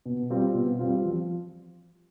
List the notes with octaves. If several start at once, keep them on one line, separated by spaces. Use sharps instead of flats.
B2
G3 C4 F4
B2
G3 C4 F4
F3